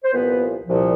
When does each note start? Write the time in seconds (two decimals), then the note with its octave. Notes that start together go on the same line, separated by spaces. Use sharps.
0.04 C5
0.13 C2 A#2 F3 B3 B4
0.66 C2 A#2 F3